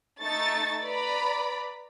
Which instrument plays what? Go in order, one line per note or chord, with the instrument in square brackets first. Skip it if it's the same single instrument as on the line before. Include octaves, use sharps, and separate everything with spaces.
[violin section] A3 D#4 A5 C#6 A6
B4 D5 A#5 B5